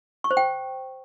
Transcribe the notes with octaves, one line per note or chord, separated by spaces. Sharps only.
C#6
C5
G5